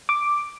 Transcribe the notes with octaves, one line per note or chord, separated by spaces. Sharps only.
D6